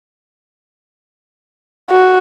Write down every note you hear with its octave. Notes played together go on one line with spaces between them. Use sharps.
F#4